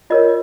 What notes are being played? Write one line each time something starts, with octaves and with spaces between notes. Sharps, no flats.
F4 A#4 C#5 D#5